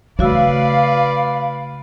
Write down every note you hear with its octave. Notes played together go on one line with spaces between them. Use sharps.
C#3 A3 F#4 B4 D5 F5 E6